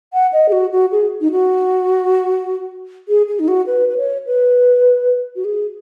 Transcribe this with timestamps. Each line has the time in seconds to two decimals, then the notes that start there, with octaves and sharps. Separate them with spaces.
0.13 F#5
0.33 D#5
0.49 G#4
0.52 F#4
0.72 F#4
0.92 G#4
1.21 D#4
1.31 F#4
3.09 G#4
3.28 G#4
3.39 D#4
3.48 F#4
3.67 B4
3.89 B4
3.97 C#5
4.27 B4
5.36 F#4
5.45 G#4